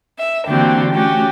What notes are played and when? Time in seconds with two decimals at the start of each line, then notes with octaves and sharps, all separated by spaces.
0.19 E5
0.48 D3 E3 A#3 C4 F#4 G4
0.91 A3 C#4 F#4 G4